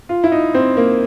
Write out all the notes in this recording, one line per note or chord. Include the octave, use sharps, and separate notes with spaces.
F4
E4
D#4
C4
A#3